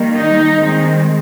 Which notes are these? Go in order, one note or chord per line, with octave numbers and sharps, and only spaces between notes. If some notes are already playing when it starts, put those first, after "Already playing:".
Already playing: D#3 G3 A#3
D#4
D#3 G#3 C4